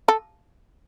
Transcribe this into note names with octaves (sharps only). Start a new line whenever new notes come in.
A4